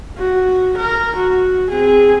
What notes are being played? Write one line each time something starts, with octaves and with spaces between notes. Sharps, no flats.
F#4
A#4
F#4
C4 G#4